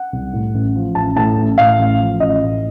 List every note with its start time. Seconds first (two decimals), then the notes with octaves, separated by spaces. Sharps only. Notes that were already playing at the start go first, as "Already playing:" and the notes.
Already playing: F#5
0.13 C2
0.33 A2
0.54 A1
0.75 F3
0.95 A1 A5
1.16 A2 A5
1.37 A1
1.58 A2 F5
1.79 A1
2.00 F3
2.20 A1 D#5
2.41 A2